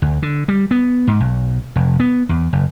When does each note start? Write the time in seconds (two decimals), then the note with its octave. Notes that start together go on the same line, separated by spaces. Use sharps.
0.02 D2
0.22 D3
0.48 G3
0.71 B3
1.07 G#2
1.20 B1
1.76 F1
2.00 B3
2.29 E2
2.53 F#1